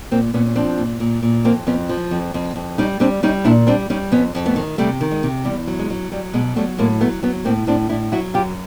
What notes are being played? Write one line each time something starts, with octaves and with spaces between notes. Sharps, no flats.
A#2 A#3 C4
A#2 B3 C#4
C#4
F3 C4 D4
A#2
A#2
A#2
F2 A#3 C4
F2 B3 C#4
F3
F2
F2
F2
G3 C#4 D#4
G3 C4 D4
G3 C#4 D#4
A#2 D4 E4
G3 C4 D4
G3 C#4 D#4
F2 B3 C#4
F2
A3 B3
D#3
C3 G3 A3
D#3
G#3
C3
E2 G3
F#3
G#3
F#3
F#3 G3
B2 G#3
F#3 G3 A3
A2 G#3 A#3
F#3 A3 B3
F#3 B3 C#4
A2 A#3 C4
A2 C4 D4
A2 D4 E4
F#3 E4 F#4
F#2 F4 G4